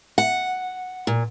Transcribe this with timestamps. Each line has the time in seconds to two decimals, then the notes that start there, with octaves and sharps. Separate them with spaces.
0.18 F#5
1.07 A#2